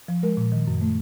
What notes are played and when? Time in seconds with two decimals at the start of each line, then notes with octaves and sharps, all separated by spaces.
0.08 F3
0.23 G#3 A#4
0.37 A#2
0.52 D#3
0.67 F#2
0.81 A3